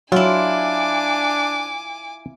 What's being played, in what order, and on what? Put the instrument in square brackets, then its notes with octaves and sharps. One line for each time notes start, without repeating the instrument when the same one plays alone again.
[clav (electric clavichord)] F#3 [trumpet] D4 [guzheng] E4 F4 [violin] G#5 D6